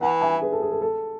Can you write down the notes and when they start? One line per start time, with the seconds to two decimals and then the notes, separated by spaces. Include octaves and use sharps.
0.01 E3 F#5 A5
0.21 E5 G#5
0.42 G#4 B4
0.52 A4
0.62 G#4
0.71 A4
0.82 A4